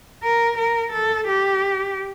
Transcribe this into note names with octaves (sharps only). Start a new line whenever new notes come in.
A#4
A#4
A4
G4